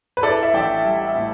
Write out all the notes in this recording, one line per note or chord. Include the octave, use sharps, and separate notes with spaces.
B4
E4 A4 D5
E5
A1 D5 G5
G3
A2